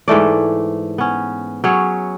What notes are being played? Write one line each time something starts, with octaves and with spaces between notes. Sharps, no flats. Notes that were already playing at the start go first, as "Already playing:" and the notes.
G#2 E3 A3 D5
B3 C#4
F#3 C#4 G#4 C#5